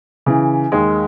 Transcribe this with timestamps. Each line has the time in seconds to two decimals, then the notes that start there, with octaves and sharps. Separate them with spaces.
0.26 C#3 E3
0.72 D#2 G#3